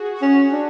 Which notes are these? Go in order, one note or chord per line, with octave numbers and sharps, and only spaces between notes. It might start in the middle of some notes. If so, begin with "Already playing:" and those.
Already playing: F#4 G#4
F#4
C#4 G#4
D4